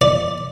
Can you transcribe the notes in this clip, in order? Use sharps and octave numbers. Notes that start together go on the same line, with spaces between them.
D5